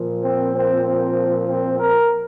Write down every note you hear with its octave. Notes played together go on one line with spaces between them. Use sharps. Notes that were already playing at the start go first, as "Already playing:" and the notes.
Already playing: A#2 F3
C4
C4
C4
C4
A#4